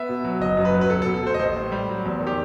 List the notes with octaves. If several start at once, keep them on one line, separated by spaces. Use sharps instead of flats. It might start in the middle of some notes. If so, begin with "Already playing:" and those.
Already playing: B3 E5
B2
F#3
F#1 D#5
F#2
B4
F#3
B4
B1 A4
A4
B2
A4
A3 C5
D#5
A1 C5
A2
G3
F#3
E2
D#3
G4